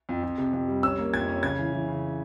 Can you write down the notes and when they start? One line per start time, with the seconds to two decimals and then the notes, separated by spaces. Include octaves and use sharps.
0.09 F2
0.23 F2
0.38 C3
0.53 F2
0.68 G3
0.83 C#4 E6
0.98 A#3
1.13 F2 G#6
1.28 C#4
1.43 C#3 G#6
1.58 E3
1.73 E3
1.88 C#3